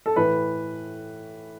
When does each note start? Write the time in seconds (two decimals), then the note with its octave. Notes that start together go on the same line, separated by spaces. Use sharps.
0.06 A4
0.16 A2 E3 B4